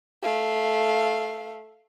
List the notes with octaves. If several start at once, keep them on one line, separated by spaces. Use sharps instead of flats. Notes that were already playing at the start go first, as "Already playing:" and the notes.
A3 F5